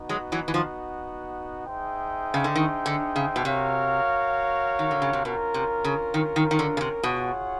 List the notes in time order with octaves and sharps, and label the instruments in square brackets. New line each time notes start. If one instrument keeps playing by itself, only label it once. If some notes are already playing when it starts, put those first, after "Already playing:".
Already playing: [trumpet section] B3 D#4 F#4
[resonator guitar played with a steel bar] F#3 G#3
E3 F#3
E3
D#3 F3
[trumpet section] D#4 G#4 C5 E5 G5
[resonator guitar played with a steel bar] C#3
D3
D#3
D3
C#3
B2
[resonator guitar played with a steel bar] C3 [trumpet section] F#4 A#4 C#5 F5
[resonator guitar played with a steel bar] D#3
D3
C#3
C3
[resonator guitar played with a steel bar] B2 [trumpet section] C#4 F4 A#4
[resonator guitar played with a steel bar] C3
C#3
D#3
D#3
D#3
D3
C#3
C3
[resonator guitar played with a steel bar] B2 [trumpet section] F4 G#4 C#5 F#5